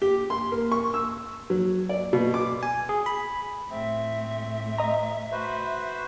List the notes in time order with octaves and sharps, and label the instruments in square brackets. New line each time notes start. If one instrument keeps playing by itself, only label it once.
[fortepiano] G4
C6
A#3
C#6
E6
F#3
D5
B2
D6
[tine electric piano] G#5
G#4
B5
[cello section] A2 A3 [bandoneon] C4 [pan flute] E5
[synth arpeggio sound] D#5 A#5
[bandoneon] F#4 B4 C5